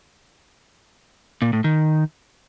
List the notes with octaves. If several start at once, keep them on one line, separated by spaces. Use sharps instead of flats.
A#2
A2
D#3